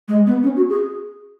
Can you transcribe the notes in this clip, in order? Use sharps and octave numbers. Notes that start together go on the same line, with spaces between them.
G#3
B3
C#4
F#4
G#4